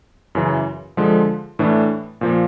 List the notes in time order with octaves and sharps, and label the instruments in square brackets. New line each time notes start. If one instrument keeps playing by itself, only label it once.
[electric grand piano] F#2 C#3 E3
D3 F3 G#3
A2 E3 A3 D4
A#2 F3 A#3